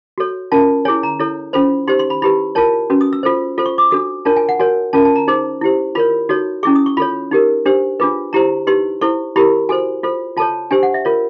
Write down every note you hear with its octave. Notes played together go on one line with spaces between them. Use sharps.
F#4 A4 C#5
C#4 F4 A#4 A5
E4 G#4 C#5 G#5
A#5
E4 A4 C#5
C#4 F4 A4 C5 B5
D#4 G4 C5 C6
C6
B5
E4 G4 B4 B5
F4 A#4 C#5 A5
C#4 F#4 B4
D#6
E6
F4 A4 C5
F4 A4 C5
C#6
D6
D4 F#4 A4 D#6
D4 F4 A#4 C#5 A5
G#5
F#5
F#4 A#4 C#5 G#5
C#4 F4 A#4 A5
A5
A#5
D#4 G#4 C5
E4 G4 C5
F4 A#4 C#5 B5
D#4 F#4 A4 C#5
C#4 E4 G#4 C#6
D#6
C#6
F4 A4 C#5 B5
D#4 G4 A#4
D4 G4 C5
D4 F4 G#4 B4
E4 G4 C5 A#5
D#4 G4 B4 C6
E4 A4 C5 C#6
E4 G4 A#4 B5
F#4 A4 C5 G#5
F4 A4 C5
F4 A4 C#5 A5
D4 G4 C5 G#5
F#5
E5
F4 A#4 C#5